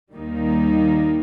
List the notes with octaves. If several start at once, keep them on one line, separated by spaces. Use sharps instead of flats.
D#2 D#3 G3 A#3 D#4